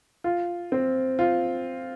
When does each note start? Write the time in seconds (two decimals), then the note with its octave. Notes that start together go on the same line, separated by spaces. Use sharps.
0.24 F4
0.72 C4
1.19 F4